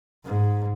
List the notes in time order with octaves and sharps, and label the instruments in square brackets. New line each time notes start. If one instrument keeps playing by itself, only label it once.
[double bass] G#2